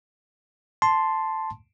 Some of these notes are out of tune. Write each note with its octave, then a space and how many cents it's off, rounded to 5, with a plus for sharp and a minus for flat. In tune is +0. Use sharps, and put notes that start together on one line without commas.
A5 +0 C6 +0